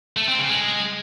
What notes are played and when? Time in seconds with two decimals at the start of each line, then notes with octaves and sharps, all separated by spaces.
0.17 A3
0.28 C4
0.39 C#3
0.50 G#3